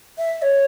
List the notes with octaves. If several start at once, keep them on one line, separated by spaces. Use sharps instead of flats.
E5
C#5